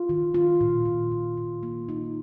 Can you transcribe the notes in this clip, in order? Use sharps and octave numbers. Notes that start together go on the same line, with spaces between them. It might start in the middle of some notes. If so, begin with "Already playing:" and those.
Already playing: F4
D#3
F4
A#2
A#2
A#2
A#2
A#3
D#4